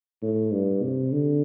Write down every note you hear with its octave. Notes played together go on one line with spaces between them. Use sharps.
A2
G2
C3
D3